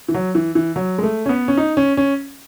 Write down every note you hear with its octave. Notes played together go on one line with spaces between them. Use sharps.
E3
F#3
E3
E3
F#3
G#3
A3
C#4
B3
C#4
D#4
C#4
C#4